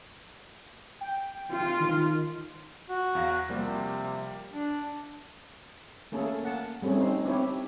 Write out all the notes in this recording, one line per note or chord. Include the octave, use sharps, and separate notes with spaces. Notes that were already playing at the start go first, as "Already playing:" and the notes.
G5
F4
D#3
F#4
E2 F5 A#6
C3 F3 G3 A#3
D4
A3 A#3 C#4 G#4 A4
A#3 F#5 A5
G3 A3 C4 C#4 G#4
C4 D#4 C5
B3 C4 D4 E4 G4 C#5